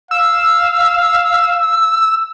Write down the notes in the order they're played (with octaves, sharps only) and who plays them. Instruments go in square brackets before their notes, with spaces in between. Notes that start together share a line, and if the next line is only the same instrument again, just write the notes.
[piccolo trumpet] F5 [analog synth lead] E6